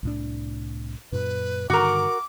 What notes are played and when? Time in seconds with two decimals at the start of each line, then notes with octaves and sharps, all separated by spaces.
0.03 C2 A2 D4
1.12 F#2 A#2 B4
1.70 G2 D3 D#3 F#4 A#4 D6